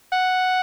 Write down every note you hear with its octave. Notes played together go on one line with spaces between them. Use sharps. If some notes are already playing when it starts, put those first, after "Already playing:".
F#5